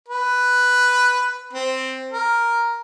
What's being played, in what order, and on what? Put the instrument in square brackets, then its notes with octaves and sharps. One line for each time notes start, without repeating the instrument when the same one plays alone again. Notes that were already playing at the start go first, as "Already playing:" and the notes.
[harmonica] B4
C4
A#4